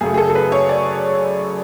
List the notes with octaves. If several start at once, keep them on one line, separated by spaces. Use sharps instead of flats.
F#2 C#3 F#3 A3 G#4
G#4
A4
A4
B4
C#5
D5